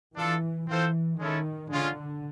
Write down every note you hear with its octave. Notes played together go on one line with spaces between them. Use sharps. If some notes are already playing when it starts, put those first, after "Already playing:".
E3 D4 F4 A4
E3 C4 F4 A4 C5
D#3 G#3 C#4 E4 A4
D3 G#3 C#4 F4